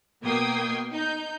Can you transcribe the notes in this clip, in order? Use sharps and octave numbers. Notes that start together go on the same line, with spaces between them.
B2 A#3 G5 D#6 G#6 C7
D#4 G6